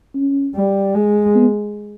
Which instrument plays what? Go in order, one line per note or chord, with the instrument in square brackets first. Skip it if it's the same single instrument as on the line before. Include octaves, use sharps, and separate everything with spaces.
[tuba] C#4
[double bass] G3
G#3
[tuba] B3